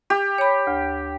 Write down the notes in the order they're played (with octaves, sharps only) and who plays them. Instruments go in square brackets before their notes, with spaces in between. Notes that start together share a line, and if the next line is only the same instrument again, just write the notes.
[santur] G4
[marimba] C#5 B5
D2